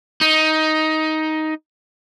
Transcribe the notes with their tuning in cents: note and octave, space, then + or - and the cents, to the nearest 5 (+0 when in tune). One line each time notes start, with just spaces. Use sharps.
D#4 +10